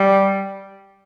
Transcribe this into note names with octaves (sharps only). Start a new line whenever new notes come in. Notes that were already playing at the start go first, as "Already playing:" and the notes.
Already playing: G3